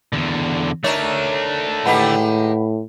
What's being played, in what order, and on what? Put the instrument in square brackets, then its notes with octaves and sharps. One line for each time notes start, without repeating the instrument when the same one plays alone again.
[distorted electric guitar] E2 D3
[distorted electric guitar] A3 D4 [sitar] D#4 A#4 C#5
[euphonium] A2 [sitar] D#3 G#3 G4 [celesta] B4 F#5 B5